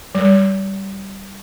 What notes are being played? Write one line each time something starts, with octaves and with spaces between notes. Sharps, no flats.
G3